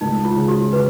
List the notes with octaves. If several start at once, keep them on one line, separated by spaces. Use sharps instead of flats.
C#2 D#4
F4
C#3
F#4
C#3 B4